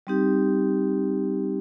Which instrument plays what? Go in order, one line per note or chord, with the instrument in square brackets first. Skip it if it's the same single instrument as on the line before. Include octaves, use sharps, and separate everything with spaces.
[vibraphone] G3 C4 D#4 G4